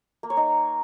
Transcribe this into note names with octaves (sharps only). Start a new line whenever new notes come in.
A#3
C#5
D#4